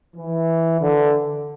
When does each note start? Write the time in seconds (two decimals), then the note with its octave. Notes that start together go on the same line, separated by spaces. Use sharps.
0.16 E3
0.82 D3